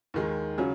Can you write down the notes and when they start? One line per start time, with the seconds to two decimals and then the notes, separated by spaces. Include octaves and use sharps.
0.14 D#2 D#3 G#3
0.58 C#3 F#3 C#4